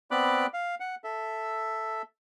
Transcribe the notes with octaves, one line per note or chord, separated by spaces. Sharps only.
B3 C4 D5 B5 D6 F#6
F5
F#5
A4 E5